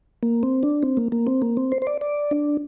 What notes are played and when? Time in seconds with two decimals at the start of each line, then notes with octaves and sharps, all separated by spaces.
0.23 A#3
0.43 C4
0.63 D4
0.83 C4
0.97 A#3
1.12 A#3
1.27 C4
1.42 A#3
1.57 C4
1.72 C5
1.82 C5
1.87 D5
2.01 D5
2.31 D4